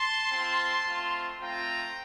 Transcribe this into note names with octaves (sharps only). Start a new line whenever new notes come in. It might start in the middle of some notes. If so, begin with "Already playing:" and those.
Already playing: A5 C6
C4 F4
A3 C4 F4
A3 C4 F4 G5 A#5